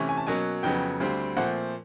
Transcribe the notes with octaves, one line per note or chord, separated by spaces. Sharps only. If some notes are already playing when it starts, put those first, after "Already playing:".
Already playing: C3 E3 A3 C#4
G#5
A5
B2 F#3 A#3 C#4 G#5
F2 C#3 F#3 B3 G5
D2 D3 G3 C4
A#2 F3 A3 C4 F#5